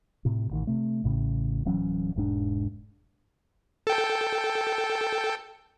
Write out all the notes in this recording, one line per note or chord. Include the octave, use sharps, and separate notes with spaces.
A2 C3
A1 D#3
C3 A3
A1 A2 C#3
D1 E3 F#3 C#4
E1 G#2 D4
A4 G5